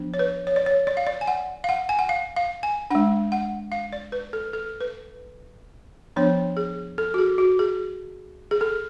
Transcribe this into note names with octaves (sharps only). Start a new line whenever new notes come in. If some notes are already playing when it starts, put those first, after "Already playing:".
Already playing: F3 B3 D4
C#5
B4
C#5
D5
C#5
D5
F5
D5
G#5
F#5
F5
F#5
G#5
F#5
F5
F5
G#5
G#3 D4 F#5
F#5
F5
D5
B4
A4
A4
B4
F3 B3 D4 C#5
G#4
A4
F#4
G#4
F#4
G#4
G#4
A4